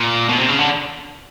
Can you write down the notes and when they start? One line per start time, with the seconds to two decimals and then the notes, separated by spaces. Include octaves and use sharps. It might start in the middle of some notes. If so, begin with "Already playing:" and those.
Already playing: A#2
0.29 B2
0.39 C3
0.49 C#3
0.59 D3